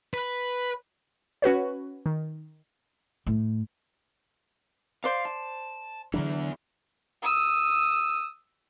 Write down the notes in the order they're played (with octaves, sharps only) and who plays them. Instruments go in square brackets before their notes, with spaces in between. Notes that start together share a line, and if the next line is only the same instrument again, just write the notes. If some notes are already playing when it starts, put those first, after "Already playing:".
[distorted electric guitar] B4
[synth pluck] C#4 F#4 B4 C#5
D#3
[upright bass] A2
[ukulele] C5 D5 [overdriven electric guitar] F5
[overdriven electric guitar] A5
[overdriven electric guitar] E2 E3 [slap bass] D3 F#3 D4
[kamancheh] D#6 E6